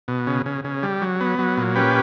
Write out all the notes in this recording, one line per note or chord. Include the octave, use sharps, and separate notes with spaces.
B2
C#3
C#3
C#3
G3
F#3
B3
F#3
A#2
C#4 G4 B4